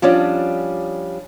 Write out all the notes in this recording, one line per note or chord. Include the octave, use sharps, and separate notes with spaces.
F3 G3 C#4 D4